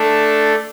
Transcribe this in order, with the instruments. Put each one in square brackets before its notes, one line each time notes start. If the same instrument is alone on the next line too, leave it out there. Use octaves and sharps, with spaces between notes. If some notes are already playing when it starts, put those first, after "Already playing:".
Already playing: [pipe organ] A3 D4 A4